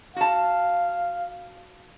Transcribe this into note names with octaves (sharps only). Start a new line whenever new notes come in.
F#4 F5 A5